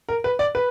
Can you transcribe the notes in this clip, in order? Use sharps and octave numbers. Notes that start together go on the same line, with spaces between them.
A#4
B4
D5
B4